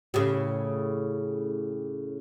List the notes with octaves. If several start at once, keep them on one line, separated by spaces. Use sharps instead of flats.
A2 C#3 G4